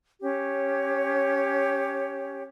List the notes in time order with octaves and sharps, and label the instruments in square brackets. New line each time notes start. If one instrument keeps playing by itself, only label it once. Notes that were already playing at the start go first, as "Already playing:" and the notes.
[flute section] C#4 G4 C#5